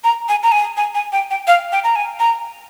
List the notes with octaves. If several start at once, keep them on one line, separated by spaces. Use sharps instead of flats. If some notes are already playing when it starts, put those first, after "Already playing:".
A#5
G#5
A#5
G#5
G#5
G#5
G5
G5
F5
G5
A#5
G#5
A#5